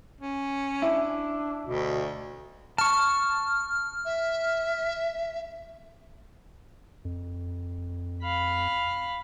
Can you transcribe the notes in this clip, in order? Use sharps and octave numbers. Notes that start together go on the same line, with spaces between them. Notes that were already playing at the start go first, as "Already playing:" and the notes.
C#4
D4 E4
D2 B2
A5 C#6 F6
E5
F2
F5 B5